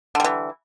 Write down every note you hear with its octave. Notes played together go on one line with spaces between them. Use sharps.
D3 E3 G3